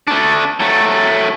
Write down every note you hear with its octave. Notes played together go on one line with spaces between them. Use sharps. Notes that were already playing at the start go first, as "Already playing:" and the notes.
A3 D4
F#3 A3